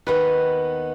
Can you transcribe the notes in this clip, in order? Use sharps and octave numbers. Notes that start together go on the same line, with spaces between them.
D#2 D#3 B3 B4